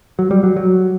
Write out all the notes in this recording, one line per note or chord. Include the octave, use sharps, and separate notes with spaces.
F#3
G3
F#3
F#3